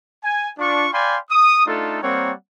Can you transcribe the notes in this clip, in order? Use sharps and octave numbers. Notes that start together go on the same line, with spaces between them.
G#5
D4 F4 C#6
D5 F5 G5 G#5 B5 C6
D#6
A3 D4 D#4 F4 A4
G3 A#3 C4 A#4 C#5 F#5